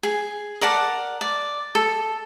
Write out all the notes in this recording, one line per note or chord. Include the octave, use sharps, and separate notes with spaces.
G#4
A#4 D5 F#5 A5
D5
A4